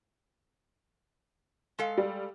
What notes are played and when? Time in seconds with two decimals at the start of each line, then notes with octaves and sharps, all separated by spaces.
1.79 G#3 A4 F5
1.97 G3